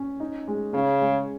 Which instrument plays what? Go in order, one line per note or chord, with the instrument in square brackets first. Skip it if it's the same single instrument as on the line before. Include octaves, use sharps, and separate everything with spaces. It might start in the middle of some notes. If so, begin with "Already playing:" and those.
Already playing: [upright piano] C#4
D#4
G#3
[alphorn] C#3 [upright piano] C#4
[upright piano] G#3